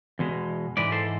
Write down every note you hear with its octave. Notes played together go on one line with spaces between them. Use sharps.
E2 B2 G#3
G#2 E3 G#3 B4 D5
A4 C5